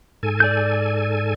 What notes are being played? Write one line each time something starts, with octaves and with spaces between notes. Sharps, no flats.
G#2 A4 G#5
D5 G6